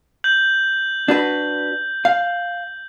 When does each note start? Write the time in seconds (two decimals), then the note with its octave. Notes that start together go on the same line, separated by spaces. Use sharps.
0.24 G6 F#7
1.08 D4 F#4 B4
2.05 F5